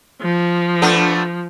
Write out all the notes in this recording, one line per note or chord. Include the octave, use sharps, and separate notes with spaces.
F3
A3 B3 D4